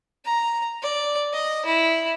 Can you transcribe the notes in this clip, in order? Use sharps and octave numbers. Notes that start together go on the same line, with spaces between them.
A#5
D5
D#5
E4